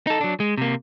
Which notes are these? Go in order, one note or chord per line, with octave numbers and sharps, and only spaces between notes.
D#4 A4
F#3 D4
G#3
C3 A#3